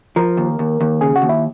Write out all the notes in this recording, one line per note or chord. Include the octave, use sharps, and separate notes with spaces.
F3 A#4
D#2
D#2
D#2
C#3 G#4
F#4
D#2
E4